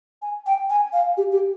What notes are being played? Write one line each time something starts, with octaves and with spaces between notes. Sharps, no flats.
G#5
G5
G#5
F5
G4
G4